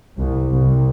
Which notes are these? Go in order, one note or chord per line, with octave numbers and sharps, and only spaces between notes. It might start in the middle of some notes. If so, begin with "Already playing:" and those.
C2
C2